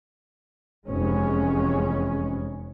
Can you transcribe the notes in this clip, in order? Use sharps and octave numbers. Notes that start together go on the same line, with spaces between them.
F1 E2 G#3 C#4